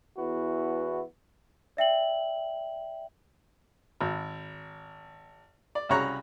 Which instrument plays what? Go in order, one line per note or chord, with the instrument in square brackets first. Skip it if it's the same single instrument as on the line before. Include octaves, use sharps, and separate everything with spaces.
[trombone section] E2 B3 E4 F#4
[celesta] D5 E5 G5 F#7
[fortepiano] G#1
D5
C2 C#3 F#4 C#5 A#5 F#6